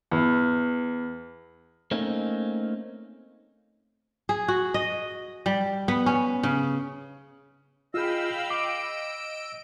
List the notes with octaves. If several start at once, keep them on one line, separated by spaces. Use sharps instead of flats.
E2
A3 A#3 C4 C#4 D#4
G#4
F#4
D#5
G3
B3
C#4
C#3
F4 G#4 D#5 F5 G5 B5 E6
D6 D7